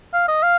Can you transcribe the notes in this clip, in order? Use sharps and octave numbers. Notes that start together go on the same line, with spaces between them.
F5
D#5
F5